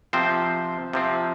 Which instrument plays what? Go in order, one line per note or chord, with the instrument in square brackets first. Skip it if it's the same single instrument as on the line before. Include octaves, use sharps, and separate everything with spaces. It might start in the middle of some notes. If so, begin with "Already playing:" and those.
[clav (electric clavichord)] C3 F3 C4 C5
C3 F3 C4